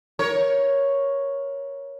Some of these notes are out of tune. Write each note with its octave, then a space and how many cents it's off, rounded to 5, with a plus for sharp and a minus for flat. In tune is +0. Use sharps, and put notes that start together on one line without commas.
A#4 +15 C#5 +0